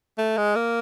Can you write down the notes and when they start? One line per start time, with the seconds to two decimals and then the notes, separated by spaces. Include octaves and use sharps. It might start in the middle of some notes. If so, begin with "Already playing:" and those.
0.18 A3
0.37 G#3
0.56 A#3